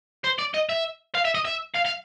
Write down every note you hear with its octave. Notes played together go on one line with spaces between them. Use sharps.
C5
D5
D#5
E5
F5
E5
D#5
E5
F5
F5